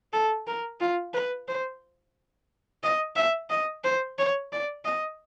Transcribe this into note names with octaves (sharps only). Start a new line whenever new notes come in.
A4
A#4
F4
B4
C5
D#5
E5
D#5
C5
C#5
D5
D#5